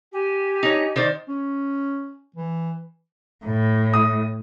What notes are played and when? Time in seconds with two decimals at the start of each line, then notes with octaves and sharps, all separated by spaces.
0.12 G4 G#5
0.63 D#4 C#5
0.96 D#3 C5 D5
1.28 C#4
2.36 E3
3.45 A2
3.94 D#6